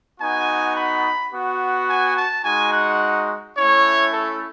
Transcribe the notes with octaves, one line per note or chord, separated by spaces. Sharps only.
B3 D#4 F#4 G#5
B5
B3 F#4
G#5
A5
G#3 D#4 F#4 G#5
F#5
A3 C#4 E4 C#5
A4